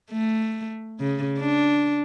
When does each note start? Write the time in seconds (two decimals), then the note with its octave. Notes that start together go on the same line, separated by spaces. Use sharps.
0.11 A3
1.00 C#3
1.39 D4